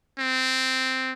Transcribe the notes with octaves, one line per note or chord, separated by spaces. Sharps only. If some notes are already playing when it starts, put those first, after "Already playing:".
C4